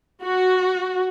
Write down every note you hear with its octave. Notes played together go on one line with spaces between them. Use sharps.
F#4